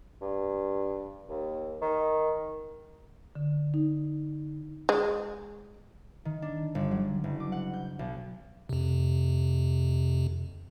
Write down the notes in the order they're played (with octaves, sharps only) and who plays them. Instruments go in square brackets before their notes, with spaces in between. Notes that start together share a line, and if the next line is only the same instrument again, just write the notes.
[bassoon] G2
D#2
D#3
[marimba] D3
D#4
[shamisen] G#3
[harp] D#3
D4
G1
F#3
F#1
D6
F#5
G6
B1
[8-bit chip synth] F2 C3